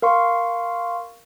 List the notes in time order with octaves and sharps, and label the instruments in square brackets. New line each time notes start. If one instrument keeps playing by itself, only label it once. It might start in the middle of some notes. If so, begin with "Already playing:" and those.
[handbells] A#4 F5 C6 C#6